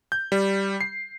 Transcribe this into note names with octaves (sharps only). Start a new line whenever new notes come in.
G6
G3
C7